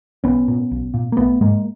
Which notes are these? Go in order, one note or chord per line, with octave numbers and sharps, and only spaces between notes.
B1 B3 C#4
A#2
B1
A#2
A#3
A#1 A3 B3
G#2 G#3 A#3